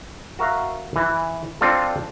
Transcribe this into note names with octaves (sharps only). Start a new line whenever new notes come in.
F#4 A#4 E5 F5
E3
C4 D4 F4 A4